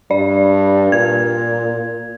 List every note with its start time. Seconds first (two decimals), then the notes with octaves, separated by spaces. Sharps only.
0.11 G2 D5
0.92 A#2 G#6